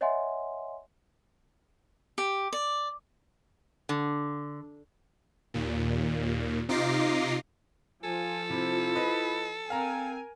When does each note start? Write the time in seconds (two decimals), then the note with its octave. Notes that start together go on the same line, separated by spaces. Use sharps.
0.01 C#5 D#5 E5 F#5 G#5 C6
2.18 G4
2.53 D5
3.89 D3
5.54 D#2 A#2
6.69 C3 D#4 F4 D6 A#6 C7
8.04 F3 F4 A4 G#5
8.50 C3 E4
8.95 B4 D#5
9.70 C4 A#4 F5 G#5 A#5